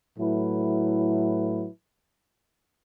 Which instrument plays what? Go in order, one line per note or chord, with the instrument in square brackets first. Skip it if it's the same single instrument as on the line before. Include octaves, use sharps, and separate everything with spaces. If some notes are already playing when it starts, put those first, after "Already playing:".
[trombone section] A2 F#3 A3 E4 B4